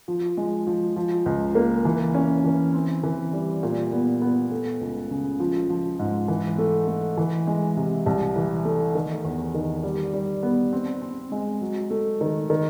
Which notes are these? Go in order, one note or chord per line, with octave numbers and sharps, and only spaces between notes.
F3
G#3
F3
F3
C#2
A#3
E3
C#4
E3
C4
E3
G3
A#2
B3
B3
A3
C#2
C#3
F3
F3
G#2
E3
A3
A3
E3
G#3
C3
C2
E3
A3
D#3
E2
D#3
G3
G3
B3
C4
C4
G#3
F#3
A3
D#3
D#3